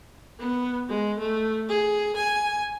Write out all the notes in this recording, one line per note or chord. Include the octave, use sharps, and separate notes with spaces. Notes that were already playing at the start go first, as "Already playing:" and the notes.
B3
G#3
A3
G#4
G#5